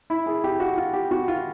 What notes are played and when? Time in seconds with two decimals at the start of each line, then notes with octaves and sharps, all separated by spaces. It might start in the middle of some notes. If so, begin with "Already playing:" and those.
0.10 E4
0.26 G#4
0.44 G4
0.60 F#4
0.77 F4
0.93 G4
1.11 F#4
1.28 F4